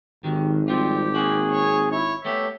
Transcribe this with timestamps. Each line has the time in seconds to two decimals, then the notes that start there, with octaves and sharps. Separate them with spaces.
0.24 G#1 D#3 F#3 G4
0.68 F3 G3 C4 F4 G4
1.15 A#3 C4 F#4 G#4
1.51 C#5
1.92 E4 C#5
2.25 A3 B3 G4 C#5 E5